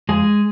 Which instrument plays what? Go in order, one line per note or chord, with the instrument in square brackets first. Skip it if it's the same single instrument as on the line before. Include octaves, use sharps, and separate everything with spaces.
[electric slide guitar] F2 G#3 G#4